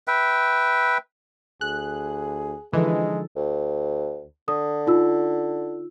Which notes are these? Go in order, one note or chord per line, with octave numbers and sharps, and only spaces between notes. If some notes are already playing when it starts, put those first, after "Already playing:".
B4 E5 G5
D2 G#4 F#6
D3 E3 F3 G#3 D#4 A4
D2
D3 D#6
D#4 F4 E6